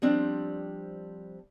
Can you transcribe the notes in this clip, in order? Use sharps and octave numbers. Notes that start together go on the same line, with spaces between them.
F3 G3 C4 D4